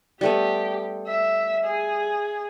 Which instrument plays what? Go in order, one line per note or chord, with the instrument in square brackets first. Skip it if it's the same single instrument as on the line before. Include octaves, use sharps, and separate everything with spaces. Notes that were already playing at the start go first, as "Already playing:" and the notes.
[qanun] G3 A3 B3 [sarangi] G4
[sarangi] E5
G#4